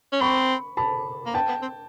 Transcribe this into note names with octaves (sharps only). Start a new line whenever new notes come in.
C#4
C4 B5 C#6
A5 B5
A#3
B3 G5 A5
B3
C4